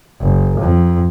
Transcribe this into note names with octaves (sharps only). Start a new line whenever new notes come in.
F#1
F2